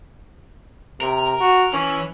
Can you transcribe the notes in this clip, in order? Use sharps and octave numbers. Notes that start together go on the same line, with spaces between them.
C3 A#4
F#4
E3 C#4